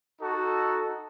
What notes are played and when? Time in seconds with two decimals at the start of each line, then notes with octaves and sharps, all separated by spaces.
0.20 D#4 F#4 A4